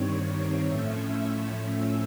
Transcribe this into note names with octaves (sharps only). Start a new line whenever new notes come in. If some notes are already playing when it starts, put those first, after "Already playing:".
Already playing: G2 D#3 G3 C4 C#5
A2 F3 A3 C#4 E5